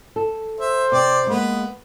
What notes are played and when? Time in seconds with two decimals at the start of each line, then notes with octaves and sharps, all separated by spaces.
0.16 A4
0.60 C5 E5
0.92 C3 C4 D5
1.27 G#3 A#3 B3